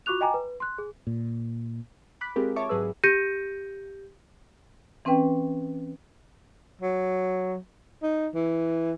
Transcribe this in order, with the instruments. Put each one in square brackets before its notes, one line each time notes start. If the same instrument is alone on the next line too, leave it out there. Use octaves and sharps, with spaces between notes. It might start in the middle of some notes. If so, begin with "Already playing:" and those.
[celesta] F4 F#4 C#6 D6 F#6 F7
D#5 G5 G#5 A#5 D6
B4
C6 F#6
G#4
[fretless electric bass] A#2
[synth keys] B5 D6 F#6 B6
G#3 C4 F4 G4 G#4 A#4
C#5 E5 A5 C#6 D6
G#1 G#2 F#3 G#4 B4 E6
[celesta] G4 G6 A#6 C#7 D#7
[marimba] E3 C4 C#4 B4 G5
[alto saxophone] F#3
D#4
E3